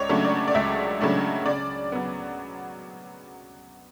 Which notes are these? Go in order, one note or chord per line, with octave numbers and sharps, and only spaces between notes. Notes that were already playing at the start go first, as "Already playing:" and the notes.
Already playing: C#2 C#5 D5
C#3 F#3 A3 D4
D5
D5
C#2 E5
C#3 F#3 A3 D4
C#3 D5
F#3 B3